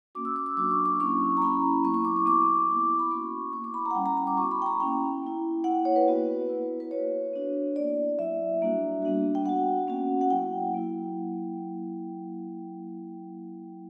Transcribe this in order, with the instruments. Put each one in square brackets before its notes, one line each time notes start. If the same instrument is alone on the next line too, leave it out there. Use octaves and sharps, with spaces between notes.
[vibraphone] A#3 C#4 F#4 D6
E6
D6
E6
F#3 A#3 D4 F#4 D6
C#6
D6
F#3 A#3 C#4 E4 C#6
A#5
A#3 C#4 E4 B5
F#3 B3 E4 C#6
C#6
D6
C#6
B3 F#4 D6
A#3 E4
B5
A#3 C#4 F#4 C#6
B3 D6
E4
D6
B5
A#5
F#5
G3 C#4 E4 G5
A#5
A#5
D6
B3 F#4 C#6
B5
G5
A#5
A#3 C#4 E4 G5
A#3 E4
A#3 E4 F#5
C#5
B4
B3 F#4
A#3 E4
B4
B3 F#4 C#5
B3 D4 F#4
A#3 E4 D5
F#3 A#3 E4 E5
G3 A#3 D4 F#4
G3 B3 D4 F#4
G5
B3 F#4 F#5
A#3 C#4 F#4
F#5
F#3 A#3 E4 G5
F#3 A#3 E4